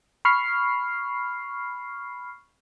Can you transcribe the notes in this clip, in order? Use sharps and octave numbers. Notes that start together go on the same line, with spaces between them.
B5 C#6 F6 C7